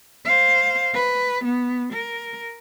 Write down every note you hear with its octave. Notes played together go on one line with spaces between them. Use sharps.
C5 F5
B4
B3
A#4